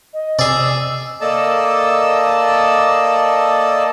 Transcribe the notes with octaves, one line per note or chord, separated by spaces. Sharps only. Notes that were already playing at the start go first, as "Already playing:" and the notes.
D#5
C3 G#4 D5 E6
A#3 A4 D5 D#5 A5 E6